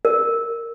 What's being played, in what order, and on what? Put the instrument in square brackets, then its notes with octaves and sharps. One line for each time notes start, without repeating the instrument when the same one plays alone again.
[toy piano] A#4